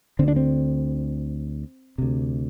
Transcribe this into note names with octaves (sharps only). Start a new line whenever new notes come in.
D2 D3 C4
D4
C4
D2 C3